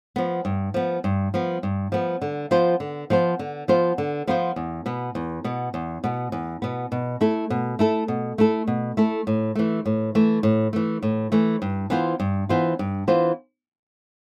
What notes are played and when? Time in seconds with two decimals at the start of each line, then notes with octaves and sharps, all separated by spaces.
0.16 F3 B3
0.45 G2
0.74 F3 B3
1.04 G2
1.34 F3 B3
1.63 G2
1.92 F3 B3
2.22 D3
2.51 F3 B3 F4 C5
2.80 D3
3.10 F3 B3 F4 C5
3.39 D3
3.68 F3 B3 F4 C5
3.98 D3
4.27 F3 B3 F4 C5
4.56 E2
4.86 B2 B3
5.15 E2
5.44 B2 B3
5.74 E2
6.04 B2 B3
6.32 E2
6.62 B2 B3
6.92 B2
7.21 A3 E4 A4
7.50 B2
7.79 A3 E4 A4
8.08 B2
8.38 A3 E4 A4
8.67 B2
8.97 A3 E4 A4
9.27 A2
9.55 E3 A3
9.86 A2
10.15 E3 A3
10.43 A2
10.73 E3 A3
11.03 A2
11.32 E3 A3
11.62 G2
11.90 E3 B3 F4 C5
12.20 G2
12.49 E3 B3 F4 C5
12.79 G2
13.08 E3 B3 F4 C5